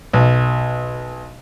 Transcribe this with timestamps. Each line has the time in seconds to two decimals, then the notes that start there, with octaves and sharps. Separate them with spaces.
0.13 B1